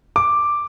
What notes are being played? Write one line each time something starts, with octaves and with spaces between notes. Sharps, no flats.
D6